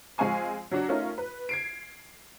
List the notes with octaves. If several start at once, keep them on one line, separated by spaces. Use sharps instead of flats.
F3 G#3 C4 F5 G#5 C#6
F#3 D4 F#4
A3 C#4 D#4 F4 A#4
B4
G#6 C7 D7